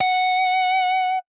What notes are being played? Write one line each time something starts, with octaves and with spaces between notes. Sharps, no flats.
F#5